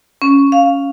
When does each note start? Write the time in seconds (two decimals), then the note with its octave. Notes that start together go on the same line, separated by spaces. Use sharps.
0.22 C#4
0.52 F5